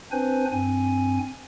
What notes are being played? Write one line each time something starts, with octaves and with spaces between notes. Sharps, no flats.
C4 D4 B4 C5 G#5
G2 C4 G#5